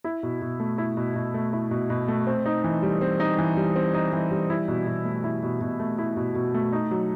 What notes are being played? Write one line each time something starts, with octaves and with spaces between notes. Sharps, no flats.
E4
B2
B2
A3
E4
B2
B2
A3
E4
B2
B2
A3
C4
D#4
E3
G3
C4
D#4
E3
G3
C4
D#4
E3
G3
E4
B2
B2
A3
E4
B2
B2
A3
E4
B2
B2
A3
D#4
F#3